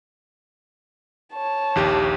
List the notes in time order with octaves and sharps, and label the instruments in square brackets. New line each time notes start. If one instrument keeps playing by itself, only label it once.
[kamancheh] C#5 A5
[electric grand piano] A#1 D#2 G4